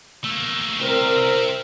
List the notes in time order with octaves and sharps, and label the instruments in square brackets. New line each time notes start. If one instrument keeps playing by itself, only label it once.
[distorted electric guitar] A3 A#3
[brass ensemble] C2 C4 A#4 [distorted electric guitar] G4 E5